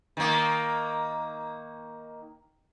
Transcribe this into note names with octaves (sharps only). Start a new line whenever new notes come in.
D#3 A#3